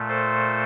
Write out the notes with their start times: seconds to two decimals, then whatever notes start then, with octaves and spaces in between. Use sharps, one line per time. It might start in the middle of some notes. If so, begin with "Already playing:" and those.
Already playing: A#2 A3
0.08 A4 C5